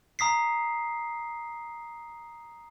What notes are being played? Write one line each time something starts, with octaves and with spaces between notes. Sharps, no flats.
A#5 D#6 B6 C7